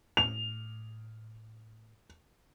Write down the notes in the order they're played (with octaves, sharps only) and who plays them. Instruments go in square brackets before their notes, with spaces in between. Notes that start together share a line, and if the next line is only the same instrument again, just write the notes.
[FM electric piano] A2 [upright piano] F7